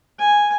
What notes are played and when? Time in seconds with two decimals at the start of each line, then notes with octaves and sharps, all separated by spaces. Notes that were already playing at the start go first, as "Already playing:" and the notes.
0.19 G#5